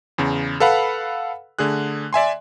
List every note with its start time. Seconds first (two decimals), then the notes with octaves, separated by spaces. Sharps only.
0.18 E2 C#3
0.60 A4 B4 F5 F#5 B5
1.59 D3 A3 G#4 F#6
2.13 D5 E5 G#5 C6